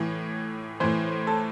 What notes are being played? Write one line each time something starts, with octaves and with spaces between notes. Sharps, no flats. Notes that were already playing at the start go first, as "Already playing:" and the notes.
Already playing: A2 E3
A2 E3 C5
A4